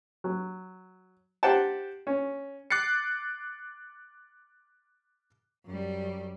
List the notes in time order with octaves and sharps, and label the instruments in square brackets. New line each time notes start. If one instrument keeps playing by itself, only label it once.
[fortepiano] F#3
G4 C5 F#5 G5 A5
C#4
[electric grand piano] D6 F#6 A6 C7 C#7
[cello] F#2 G3